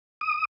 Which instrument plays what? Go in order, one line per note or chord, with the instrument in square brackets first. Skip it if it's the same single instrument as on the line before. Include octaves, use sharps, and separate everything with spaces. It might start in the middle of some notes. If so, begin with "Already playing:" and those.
[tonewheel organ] D#6